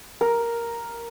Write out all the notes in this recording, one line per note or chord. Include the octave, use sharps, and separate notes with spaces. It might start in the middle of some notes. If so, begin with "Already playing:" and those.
A#4